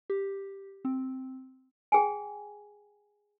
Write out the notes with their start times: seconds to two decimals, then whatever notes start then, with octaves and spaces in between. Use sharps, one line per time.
0.10 G4
0.85 C4
1.92 G#4 G5 G#5